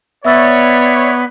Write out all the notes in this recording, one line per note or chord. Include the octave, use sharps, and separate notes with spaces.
B3 C#5 D5 E5 E6 A6